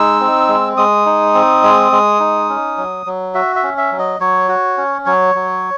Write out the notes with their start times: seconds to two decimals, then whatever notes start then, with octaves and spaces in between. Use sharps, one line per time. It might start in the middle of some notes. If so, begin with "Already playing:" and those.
Already playing: G#3 D#4 E6
0.20 C4
0.48 G#3
0.77 G#3 D#6
1.06 D#4
1.34 C4
1.63 G#3
1.92 G#3
2.20 D#4
2.49 C#4
2.78 F#3
3.06 F#3
3.34 F#4 E5
3.56 E5
3.63 C#4
3.78 E5
3.92 F#3
3.99 D#5
4.20 F#3 C#5
4.48 F#4
4.77 C#4
5.06 F#3 C#5
5.35 F#3